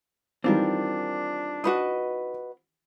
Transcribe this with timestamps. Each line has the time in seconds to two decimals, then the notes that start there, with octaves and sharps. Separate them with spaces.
0.44 D#3 E3 G3 C4 D4 F4 A#4
1.64 F#4 B4 D#5